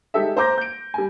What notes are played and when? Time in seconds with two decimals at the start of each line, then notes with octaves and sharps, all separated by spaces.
0.14 G#3 D#4 G4 A4 E5
0.37 C5 A#5 D6 G6 A#6
0.58 G6 D7
0.94 G3 G#5